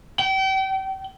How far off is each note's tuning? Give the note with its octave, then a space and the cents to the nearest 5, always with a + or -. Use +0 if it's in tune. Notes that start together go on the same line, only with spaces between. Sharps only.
G5 -35